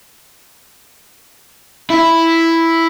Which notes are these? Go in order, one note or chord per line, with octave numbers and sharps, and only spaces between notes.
E4